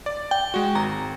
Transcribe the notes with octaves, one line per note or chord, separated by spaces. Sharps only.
D5
G5
G#3 F#4
G#1 A#5